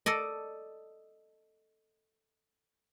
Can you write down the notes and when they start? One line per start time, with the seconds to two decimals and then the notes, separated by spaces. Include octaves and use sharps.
0.06 A4 D5 D#5